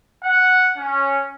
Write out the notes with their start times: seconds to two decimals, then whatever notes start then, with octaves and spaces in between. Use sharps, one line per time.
0.24 F#5
0.78 C#4